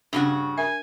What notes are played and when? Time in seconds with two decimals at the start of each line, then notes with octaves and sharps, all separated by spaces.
0.13 G2 C#3 D4 F#4
0.58 A#4 E5 G#5